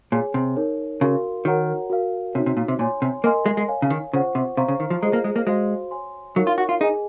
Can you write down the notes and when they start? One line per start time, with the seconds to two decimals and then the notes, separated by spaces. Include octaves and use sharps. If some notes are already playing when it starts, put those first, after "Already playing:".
0.12 A#2 G#4 C#5 G#5
0.34 C3
0.56 D#4 A#4 C#5
1.01 C#3 F#4 A#4 F5 C6
1.45 D#3 F#4 A#4 C#5 F#5 A#5
1.90 F#4 A#4 F5
2.34 C3 D#4 F#4 C#5
2.46 C3
2.57 A#2
2.68 C3
2.79 A#2 C#5 G#5 C6
3.02 C3
3.24 A#3 A#4 D#5 G#5 C6
3.46 G#3
3.57 G#3
3.68 C#5 F5 G#5
3.82 C#3
3.90 D#3
4.13 C#3 F4 C5 F#5 C#6
4.35 C3
4.57 C3 C5 F5 A#5 C#6
4.68 C#3
4.80 D#3
4.90 F3
5.01 G#3 F4 G#4 C5 D#5 A#5
5.13 A#3
5.24 G#3
5.36 A#3
5.47 G#3 F#4 C5 F5 C6
5.91 C#5 G#5 C6
6.36 F#3 D#4 A#4 C#5 F5
6.47 F4
6.58 F#4
6.69 F4
6.80 D#4 G#4 D#5 G#5